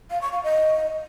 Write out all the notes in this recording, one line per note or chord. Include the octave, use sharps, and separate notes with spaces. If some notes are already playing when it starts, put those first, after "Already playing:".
F5
C#6
F5
D#5